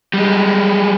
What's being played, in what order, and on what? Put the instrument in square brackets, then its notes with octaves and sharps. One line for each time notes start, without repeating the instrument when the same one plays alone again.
[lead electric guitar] G3 G#3